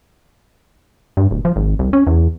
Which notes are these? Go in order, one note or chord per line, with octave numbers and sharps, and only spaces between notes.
G2
D1
F3
G#1
C2
C#4
E2